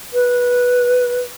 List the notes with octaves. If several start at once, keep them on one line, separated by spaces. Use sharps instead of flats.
B4